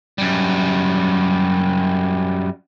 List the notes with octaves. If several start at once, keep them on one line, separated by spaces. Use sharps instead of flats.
F#2 G3